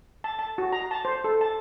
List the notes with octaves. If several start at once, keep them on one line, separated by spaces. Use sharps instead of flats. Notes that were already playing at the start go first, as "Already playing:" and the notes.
A5
A5
F#4
A#5
A5
C5
A4
A5